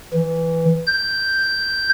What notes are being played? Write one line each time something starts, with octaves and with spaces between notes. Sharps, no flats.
E3
G6